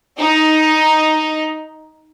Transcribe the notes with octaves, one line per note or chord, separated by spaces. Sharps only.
D#4